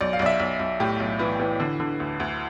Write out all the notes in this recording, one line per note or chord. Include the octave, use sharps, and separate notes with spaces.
B1 D5
F5
B1 D5
E5
B1
B1
A2 G4
B1
E3 E4
E3
D3
D3
D2
D2